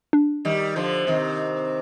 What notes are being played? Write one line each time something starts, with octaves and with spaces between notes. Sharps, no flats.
D4
D#3 G3
D3 F3
C3 D#3